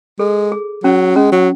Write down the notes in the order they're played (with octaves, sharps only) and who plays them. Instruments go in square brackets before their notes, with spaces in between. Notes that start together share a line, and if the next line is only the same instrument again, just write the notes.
[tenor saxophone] G#3 [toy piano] A4
[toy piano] G#4
[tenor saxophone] F#3 [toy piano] C#4
[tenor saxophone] G#3 [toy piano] C#4
[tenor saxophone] F#3